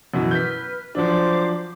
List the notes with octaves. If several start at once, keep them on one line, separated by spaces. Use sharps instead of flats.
F#2 B2 E3
B4 F6 G6 B6
F3 F#3 D4 C5 D6